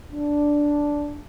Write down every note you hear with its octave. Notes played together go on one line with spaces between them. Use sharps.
D4